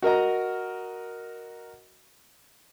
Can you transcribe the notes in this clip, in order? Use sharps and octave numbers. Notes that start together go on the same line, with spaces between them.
F#4 A#4 D#5 A#5